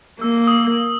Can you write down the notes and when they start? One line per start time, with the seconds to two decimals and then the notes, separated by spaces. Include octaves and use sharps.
0.21 A#3 E6
0.47 D#6